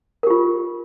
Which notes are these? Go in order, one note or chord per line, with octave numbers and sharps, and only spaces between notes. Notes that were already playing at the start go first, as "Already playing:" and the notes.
F4 G4 A#4